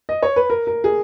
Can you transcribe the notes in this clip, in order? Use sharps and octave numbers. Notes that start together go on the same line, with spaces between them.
D#5
C#5
B4
A#4
A#4
G#4